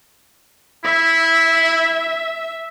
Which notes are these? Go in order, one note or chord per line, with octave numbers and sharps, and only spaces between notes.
E4 E5